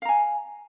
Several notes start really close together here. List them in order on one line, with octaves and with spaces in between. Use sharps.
F5 A#5 G#5